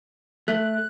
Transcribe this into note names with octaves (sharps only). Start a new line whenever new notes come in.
A3 F#6